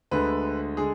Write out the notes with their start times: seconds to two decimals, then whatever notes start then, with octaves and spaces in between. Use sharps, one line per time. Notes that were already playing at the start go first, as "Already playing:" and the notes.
0.11 D2 D3 G#3 B4
0.77 D3 G#3 G#4